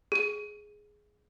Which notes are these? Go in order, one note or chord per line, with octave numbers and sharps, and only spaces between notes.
G#4 D#7